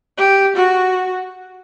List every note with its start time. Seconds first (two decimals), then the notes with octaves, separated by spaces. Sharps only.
0.18 G4
0.57 F#4